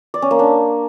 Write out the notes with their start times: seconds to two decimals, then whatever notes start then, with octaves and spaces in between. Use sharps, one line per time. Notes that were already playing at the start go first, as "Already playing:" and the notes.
0.14 D5
0.22 C#4
0.31 A#3
0.39 D4